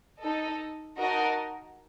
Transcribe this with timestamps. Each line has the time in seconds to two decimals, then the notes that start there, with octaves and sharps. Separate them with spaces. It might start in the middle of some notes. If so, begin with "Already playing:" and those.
0.22 D#4 A4 D#5
0.97 D#4 F#4 A#4 D#5 A5